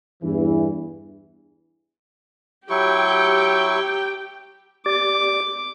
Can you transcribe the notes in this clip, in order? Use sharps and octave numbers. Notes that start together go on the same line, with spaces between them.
E2 G2 E3
F#3 E4 G4 G5 C#6
G4 D5 D6